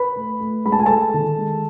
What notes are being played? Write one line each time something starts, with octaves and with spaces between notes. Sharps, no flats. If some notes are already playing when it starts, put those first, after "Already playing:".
Already playing: B4 B5
A3
A3
G#3 B5
A5
G#5
G#3 A4 A5
D#3
G#3